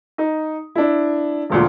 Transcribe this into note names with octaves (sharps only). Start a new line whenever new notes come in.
D#4
D4 E4
E1 D2 A#2